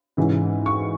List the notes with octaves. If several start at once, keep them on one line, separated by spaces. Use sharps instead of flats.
G#2 E3 C#4
C#6